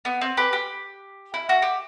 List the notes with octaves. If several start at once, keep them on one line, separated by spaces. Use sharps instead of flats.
B3
C4
G4 B4
G4
E4
F#4
G4